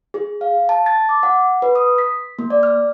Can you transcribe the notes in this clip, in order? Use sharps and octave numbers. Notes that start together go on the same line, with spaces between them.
G#4
F5
A5
A6
D6
F#5
B4
D#6
B6
A#3
D5
F6